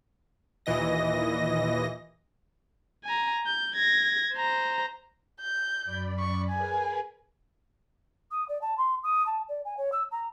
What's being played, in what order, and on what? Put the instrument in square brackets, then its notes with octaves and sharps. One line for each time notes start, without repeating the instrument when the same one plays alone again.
[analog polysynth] D#2 A#2 E3 D#5 A#6
[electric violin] G#5 A#5
G6
G#6 A#6
C5 A#5
[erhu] G6
[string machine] F#2 D5 B5
[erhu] C#6
[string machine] G#4 A#4 B4 [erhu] G#5
[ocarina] D#6
D5
A5
C6
D#6
A5
D5
G#5
C#5
E6
A#5